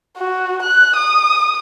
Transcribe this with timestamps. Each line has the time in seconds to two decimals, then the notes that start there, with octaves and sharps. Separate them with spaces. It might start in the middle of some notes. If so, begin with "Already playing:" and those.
0.18 F#4
0.63 F#6
0.96 D#6